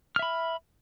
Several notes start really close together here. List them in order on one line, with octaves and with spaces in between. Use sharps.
F6 E5 B5